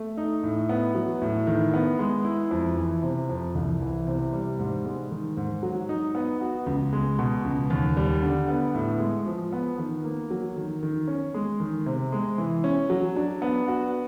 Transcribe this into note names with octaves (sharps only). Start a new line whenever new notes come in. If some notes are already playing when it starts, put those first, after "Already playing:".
Already playing: A3
D#4
A2
B3
F#3
A2
D#3
B3
G#3
E4
F2
E3
C3
F2
C2
E3
C3
G3
G#2
G#3
D#3
G#2
F#3
D#4
B3
F#4
C#2
G#3
B2
C#2
D#2
G3
D3
B3
A2
G#3
F3
B3
D#3
A#3
F#3
D#3
D#3
C#4
G#3
D#3
C3
G#3
E3
C#4
F#3
D4
B3
F#4